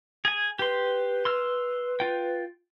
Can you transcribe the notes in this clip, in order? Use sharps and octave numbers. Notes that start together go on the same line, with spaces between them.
G#4 G#5
G4 B4 C6
C6 E6 F6
F4 G5